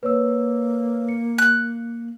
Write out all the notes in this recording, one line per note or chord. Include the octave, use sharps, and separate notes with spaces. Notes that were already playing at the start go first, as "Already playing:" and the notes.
A#3 B4 C#5 E6
C#7
F#6